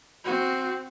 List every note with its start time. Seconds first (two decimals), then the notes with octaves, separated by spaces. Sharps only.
0.25 C4 F#4